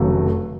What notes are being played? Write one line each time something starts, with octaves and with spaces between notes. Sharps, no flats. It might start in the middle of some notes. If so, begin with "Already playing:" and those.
Already playing: F1 D#2 C#3 F#3 A3